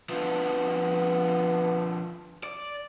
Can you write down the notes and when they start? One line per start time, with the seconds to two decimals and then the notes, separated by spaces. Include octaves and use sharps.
0.09 D3 F3 B3
2.43 D5